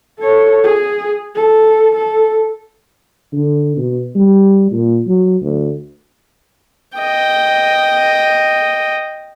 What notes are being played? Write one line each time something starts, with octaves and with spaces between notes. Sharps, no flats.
A4 C#5
G#4
A4
A4
D3
B2
G3
A#2
F#3
D2
D#5 G5